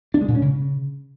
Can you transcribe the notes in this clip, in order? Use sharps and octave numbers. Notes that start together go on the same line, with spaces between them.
D4
G#3
A#2
C#4
C#3